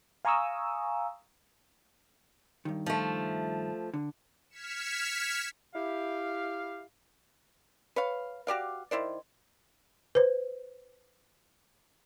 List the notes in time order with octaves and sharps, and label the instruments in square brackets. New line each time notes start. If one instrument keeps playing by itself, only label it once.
[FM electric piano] F5 G#5 A#5 C#6 D#6 E6
[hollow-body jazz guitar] G2 D#3
[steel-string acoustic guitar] F3 A3
[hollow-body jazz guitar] D3
[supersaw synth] F6 G#6 B6 C#7 E7
[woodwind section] E4 G4 F5
[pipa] B4 C#5 F5
F#4 G4 D5 F5
D#3 E4 C5 D5
[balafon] B4 C5